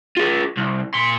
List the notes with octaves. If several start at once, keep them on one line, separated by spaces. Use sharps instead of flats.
F4 G#4
C2
A#2 C6